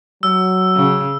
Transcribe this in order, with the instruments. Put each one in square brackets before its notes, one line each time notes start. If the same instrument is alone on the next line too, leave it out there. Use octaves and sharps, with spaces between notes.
[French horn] F#3 [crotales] E6
[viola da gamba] C#3